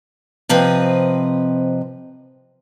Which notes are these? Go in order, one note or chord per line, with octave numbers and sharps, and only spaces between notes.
C3 F3 C4 B4 D#5